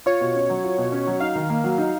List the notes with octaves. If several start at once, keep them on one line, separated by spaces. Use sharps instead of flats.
F4 C#5
B2
C#4
F#3
F4
B2
C#4
F#3
D#4 F5
D#3
A#3
F#3
D#4